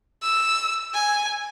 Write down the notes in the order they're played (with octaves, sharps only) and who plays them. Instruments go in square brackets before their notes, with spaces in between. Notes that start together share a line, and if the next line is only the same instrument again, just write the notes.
[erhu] E6
G#5